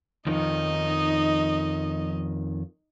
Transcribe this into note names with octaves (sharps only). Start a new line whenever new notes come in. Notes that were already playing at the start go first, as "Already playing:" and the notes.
F2 D#3 F3 D#4 D#5